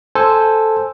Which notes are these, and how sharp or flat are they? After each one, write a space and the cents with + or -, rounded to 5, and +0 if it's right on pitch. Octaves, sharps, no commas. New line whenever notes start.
A4 +0 C5 +0 G#5 +0